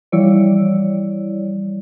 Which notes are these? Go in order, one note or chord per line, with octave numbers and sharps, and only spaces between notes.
E3 F3 G3 E4 C#5 D5